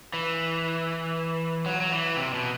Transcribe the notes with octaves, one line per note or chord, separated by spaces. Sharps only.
E3
F#3
F#3
E3
C3
B2